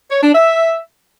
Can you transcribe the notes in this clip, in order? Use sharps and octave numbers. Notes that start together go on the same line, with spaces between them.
C#5
D4
E5